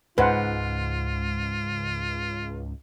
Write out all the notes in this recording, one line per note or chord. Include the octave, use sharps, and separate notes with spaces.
C#2 G#2 F4 B4 C5 F#5